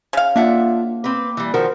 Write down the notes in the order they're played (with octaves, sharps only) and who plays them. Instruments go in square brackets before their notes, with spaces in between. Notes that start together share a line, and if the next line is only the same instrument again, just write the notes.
[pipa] C#3 F5
[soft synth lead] A#3 [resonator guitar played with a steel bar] D4 E5 F#5 [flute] F4
[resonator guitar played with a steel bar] C4 B4 [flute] D6
[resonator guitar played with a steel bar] E3 G3
[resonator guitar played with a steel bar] D#3 F3 F#4 [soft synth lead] A#4 [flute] C5